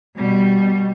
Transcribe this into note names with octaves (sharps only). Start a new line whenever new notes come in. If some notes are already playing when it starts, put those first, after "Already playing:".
B2 G3